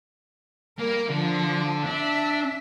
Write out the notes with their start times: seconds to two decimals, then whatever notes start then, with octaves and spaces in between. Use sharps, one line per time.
0.79 G3 A#3 A#4
1.09 D3 F3 D4
1.86 D4 E5